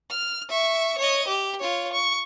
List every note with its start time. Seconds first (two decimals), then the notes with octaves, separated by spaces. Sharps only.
0.10 F6
0.50 E5 C#6
0.98 C#5 D#5
1.28 G4
1.60 F4 C#5
1.93 C#6